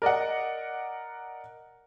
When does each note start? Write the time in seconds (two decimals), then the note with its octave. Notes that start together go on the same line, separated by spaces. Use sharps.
0.02 A#4 D5 D#5 F#5